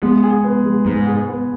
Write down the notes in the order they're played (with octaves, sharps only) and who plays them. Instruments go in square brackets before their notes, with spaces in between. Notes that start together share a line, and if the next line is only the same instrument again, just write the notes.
[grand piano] G#3 [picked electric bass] B3
[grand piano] G#4
B3
G#3
[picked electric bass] G#2 [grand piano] G#3
[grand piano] G#4
B3